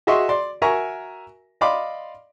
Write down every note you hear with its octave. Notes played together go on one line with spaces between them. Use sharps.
F#4 G#4 D#5 E5 C6 C#6
D5 C6
F#4 A#4 E5 G#5 A#5 C#6
D5 D#5 F5 B5 C6 D6